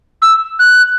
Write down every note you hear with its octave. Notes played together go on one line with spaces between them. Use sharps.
E6
F#6